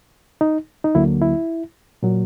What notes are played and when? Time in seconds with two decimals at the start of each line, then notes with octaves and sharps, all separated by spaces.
0.41 D#4
0.84 D#4
0.95 D2 D3 F#3 A#3 E4
1.22 E4
2.03 A#2 F#3 A#3